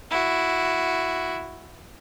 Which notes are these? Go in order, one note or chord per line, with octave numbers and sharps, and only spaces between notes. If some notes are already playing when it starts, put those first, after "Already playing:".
E4 F#4